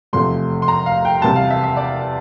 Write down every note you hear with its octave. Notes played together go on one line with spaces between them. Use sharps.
F1 E2 C3 F3 A3 C6
C6
A#5
F5
G5
E2 C3 E3 G3 A5
F5
E5
E5
D5